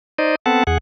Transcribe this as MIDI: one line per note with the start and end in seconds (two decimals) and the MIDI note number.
0.18 0.35 63
0.18 0.35 72
0.18 0.35 74
0.18 0.35 75
0.46 0.63 59
0.46 0.63 60
0.46 0.63 69
0.46 0.63 78
0.46 0.63 81
0.67 0.78 40
0.67 0.78 68
0.67 0.78 78